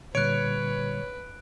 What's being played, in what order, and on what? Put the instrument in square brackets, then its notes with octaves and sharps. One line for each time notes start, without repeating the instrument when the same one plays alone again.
[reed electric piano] A#2 D3 G3 [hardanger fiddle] B4 [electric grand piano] C#5 [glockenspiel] F#6 D7